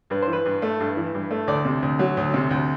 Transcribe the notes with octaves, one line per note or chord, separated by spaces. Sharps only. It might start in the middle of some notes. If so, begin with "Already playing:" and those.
G2 B4
C5
E3
B4
G2
A3
G2
E3
G2
A3
D2 D5
C3
D2
F#3
D2
C3
D2